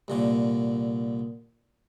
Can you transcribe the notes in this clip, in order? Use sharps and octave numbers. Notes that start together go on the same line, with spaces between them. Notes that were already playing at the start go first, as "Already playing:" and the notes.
C2 A#2 D3